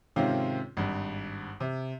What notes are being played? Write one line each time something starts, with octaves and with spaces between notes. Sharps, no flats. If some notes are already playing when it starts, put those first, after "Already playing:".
G#2 C3 D#3 C4 C#4 F4
G#1 G2
C3